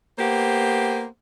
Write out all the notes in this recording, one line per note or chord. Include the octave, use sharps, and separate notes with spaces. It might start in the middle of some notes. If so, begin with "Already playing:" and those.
A#3 B3 G4 C5